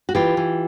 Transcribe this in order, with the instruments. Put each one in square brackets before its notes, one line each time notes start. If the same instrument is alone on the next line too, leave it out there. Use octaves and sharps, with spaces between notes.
[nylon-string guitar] F#4
E3 F4 G4
E3